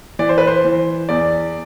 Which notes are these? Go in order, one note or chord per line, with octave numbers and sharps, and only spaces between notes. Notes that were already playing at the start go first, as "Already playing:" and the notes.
E3 D5
C5
B4
C5
E3
E2 D5